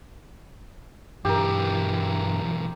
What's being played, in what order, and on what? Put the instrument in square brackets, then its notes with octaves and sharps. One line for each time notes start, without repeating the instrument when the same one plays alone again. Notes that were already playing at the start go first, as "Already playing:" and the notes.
[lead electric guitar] B1 E3 [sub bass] G2 [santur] G4 A#4